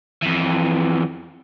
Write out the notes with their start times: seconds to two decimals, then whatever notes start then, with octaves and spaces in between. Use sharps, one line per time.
0.22 F2 E3